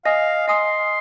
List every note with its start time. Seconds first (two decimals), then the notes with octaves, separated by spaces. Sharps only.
0.05 D#5 F5 G#5 D#6
0.48 D#5 G#5 C6 D#6